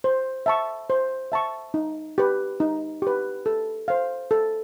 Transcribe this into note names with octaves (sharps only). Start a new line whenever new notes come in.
C5
E5 A5 C#6
C5
E5 A5 C#6
D#4
G4 B4
D#4
G4 B4
A4
C5 F5
A4